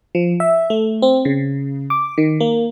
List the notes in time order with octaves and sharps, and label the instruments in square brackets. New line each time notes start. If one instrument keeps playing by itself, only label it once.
[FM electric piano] F3
E5
A3
C4
C#3
D6
D#3
A#3